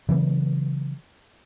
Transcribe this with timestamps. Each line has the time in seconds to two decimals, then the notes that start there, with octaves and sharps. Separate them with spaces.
0.09 C#3 E3 F#3 B3